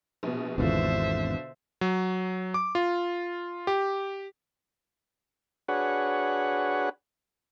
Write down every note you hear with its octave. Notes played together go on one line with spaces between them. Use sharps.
A#1 B2
G#1 E2 B2 D3 F4 C5 E5
F#3
D6
F4
G4
D4 F#4 G#4 B4 C#5 F#5